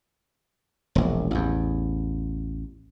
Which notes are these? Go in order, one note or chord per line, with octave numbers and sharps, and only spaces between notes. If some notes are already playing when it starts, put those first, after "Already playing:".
E1 A#1
A1 E2